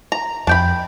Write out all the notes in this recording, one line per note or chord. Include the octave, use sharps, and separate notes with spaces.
A#5
F2 D4 G5 B5